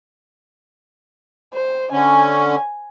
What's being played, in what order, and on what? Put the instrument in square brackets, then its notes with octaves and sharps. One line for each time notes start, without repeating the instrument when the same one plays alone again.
[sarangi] C5
[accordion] D3 C#4 [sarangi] G#5